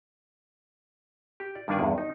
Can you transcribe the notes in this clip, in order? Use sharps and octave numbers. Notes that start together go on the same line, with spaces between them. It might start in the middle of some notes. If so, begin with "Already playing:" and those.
G4
D5
G2 D#3 A#3 D4 D5 G#5
E2 G2
D#4